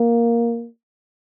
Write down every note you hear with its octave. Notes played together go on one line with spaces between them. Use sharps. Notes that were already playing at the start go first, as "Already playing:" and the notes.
Already playing: A#3